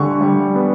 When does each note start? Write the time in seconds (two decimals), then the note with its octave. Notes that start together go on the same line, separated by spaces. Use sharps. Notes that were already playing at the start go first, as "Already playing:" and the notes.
Already playing: D3 G3 C#6
0.21 G3
0.55 B3